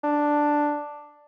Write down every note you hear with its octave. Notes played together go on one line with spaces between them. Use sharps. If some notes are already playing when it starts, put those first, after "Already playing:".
D4